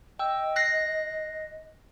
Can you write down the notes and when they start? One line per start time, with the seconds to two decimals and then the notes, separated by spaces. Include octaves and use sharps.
0.19 D#5 G5 E6
0.56 F#6 A#6 C7